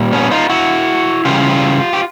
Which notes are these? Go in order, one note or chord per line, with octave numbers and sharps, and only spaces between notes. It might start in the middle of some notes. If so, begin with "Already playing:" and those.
Already playing: A#2 G3
B3 C#4
D#4 F4
E4 F#4
C#3 E3 G3 F4 G4
G4